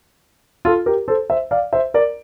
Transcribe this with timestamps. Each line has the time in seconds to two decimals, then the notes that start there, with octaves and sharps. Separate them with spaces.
0.65 F4 A4
0.86 G4 A#4
1.08 A4 C5
1.30 C5 E5
1.51 D5 F5
1.73 C5 E5
1.94 A#4 D5